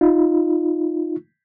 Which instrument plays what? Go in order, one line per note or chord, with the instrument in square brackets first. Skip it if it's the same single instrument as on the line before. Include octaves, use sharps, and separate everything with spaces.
[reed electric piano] D#4 F4